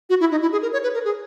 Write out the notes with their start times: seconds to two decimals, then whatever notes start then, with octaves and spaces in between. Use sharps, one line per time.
0.10 F#4
0.20 E4
0.31 D#4
0.42 E4
0.52 G#4
0.62 A#4
0.73 C#5
0.83 B4
0.94 A#4
1.05 G#4